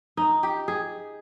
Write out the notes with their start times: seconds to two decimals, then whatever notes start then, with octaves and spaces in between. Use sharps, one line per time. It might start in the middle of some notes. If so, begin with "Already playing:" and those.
0.17 D#4
0.43 G4
0.68 G#4